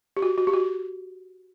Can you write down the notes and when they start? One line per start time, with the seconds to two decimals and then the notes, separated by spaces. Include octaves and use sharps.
0.17 G4
0.22 F#4
0.38 F#4
0.47 G4
0.54 F#4